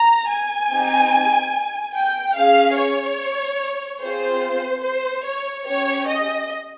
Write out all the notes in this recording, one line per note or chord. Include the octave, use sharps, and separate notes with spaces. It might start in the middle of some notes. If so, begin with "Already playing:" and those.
Already playing: A#5
G#5
C4 D#4 G4
G5
C#4 G#4 F5
C#5
C4 F4 G#4 C5
C5
C#5
C#4 G4 C#5
D#5